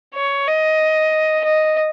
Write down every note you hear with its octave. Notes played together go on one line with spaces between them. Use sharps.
C#5
D#5
D#5